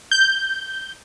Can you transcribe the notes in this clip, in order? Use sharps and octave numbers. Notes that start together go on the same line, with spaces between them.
G6